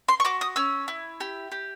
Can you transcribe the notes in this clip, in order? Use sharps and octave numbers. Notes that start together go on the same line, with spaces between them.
C6
C#6
F#4 D6
D#6
C#4 E6
E4
G4
G4